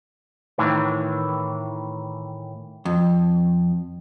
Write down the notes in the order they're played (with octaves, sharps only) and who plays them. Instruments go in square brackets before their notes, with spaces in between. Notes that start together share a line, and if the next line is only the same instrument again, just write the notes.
[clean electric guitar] A2 D#3 E3
[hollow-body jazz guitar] F2